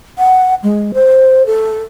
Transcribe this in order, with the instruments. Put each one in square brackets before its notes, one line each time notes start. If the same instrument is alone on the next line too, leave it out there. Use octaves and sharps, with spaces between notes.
[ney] F#5
G#3
C5
A4